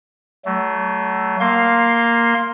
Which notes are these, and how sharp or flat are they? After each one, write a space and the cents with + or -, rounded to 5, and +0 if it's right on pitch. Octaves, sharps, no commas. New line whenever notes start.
F#3 +35 A3 +0
A#3 +0 F5 +0 C6 +10